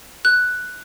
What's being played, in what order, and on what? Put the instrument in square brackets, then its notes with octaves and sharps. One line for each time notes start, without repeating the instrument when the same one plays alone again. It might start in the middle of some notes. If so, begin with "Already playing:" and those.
[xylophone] F#6